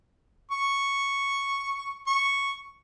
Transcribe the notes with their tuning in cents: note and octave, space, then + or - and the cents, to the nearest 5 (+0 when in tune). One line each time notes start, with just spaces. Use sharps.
C#6 +0
C#6 +0